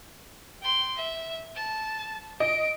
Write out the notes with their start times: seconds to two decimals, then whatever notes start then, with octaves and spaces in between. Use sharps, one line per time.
0.62 G5 C6
0.96 E5
1.55 A5
2.40 D#5 D7